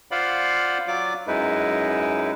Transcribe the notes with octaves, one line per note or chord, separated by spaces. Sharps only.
F4 C5 D5 F5 F#5 B5
F#3 F4 D5 D6
F#2 G#3 D#4 E4 B4